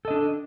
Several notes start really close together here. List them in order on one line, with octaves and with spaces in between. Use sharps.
A4 D#5 D4